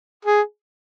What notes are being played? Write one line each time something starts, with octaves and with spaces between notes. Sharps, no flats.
G#4